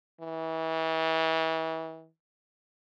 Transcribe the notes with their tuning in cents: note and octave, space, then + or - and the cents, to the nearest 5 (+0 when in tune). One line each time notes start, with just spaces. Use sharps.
E3 -35